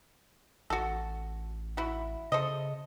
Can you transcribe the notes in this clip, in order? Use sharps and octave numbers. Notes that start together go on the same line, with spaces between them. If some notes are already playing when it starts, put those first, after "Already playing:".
A1 F#4 A4
E4 F#4
C#3 A4 C5 D#5